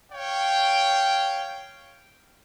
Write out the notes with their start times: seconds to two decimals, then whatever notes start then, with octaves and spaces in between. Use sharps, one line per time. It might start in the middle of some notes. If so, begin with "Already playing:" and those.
0.12 C#5 F5 G5